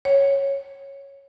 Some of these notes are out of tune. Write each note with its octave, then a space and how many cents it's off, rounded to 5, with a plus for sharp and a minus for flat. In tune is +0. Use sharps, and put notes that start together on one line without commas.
C#5 -5